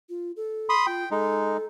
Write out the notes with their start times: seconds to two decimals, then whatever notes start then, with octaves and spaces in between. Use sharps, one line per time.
0.09 F4
0.36 A4
0.69 B5 C6 D#6
0.87 F4 G5
1.11 G#3 D#4 A4